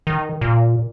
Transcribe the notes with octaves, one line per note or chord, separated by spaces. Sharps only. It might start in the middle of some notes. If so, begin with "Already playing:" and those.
D#3
A#2